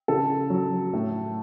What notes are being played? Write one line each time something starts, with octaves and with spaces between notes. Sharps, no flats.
C#3 A4
F#3
A2